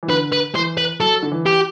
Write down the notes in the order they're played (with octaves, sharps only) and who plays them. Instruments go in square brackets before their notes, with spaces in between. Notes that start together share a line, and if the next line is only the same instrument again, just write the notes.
[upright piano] E3
[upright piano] D3 [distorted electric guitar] B4
[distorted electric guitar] B4
[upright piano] E3 [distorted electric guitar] C5
[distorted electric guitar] B4
[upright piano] F#3 [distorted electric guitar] A4
[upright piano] D3
E3
[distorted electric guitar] G4